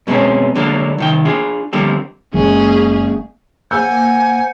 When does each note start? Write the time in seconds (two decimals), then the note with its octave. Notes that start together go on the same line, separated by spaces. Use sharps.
0.07 F#2 B2 G#3 A3 C4 C#4
0.55 D3 F#3 G#3 A#3 D4
0.98 C2 D#3 G5
1.25 D4 F4 G#4
1.73 D3 F3 G3 A#3 C4
2.34 F#1 G#3 A#3 C#4 G#4
3.71 A#3 C5 F#5 G#5 E6 G6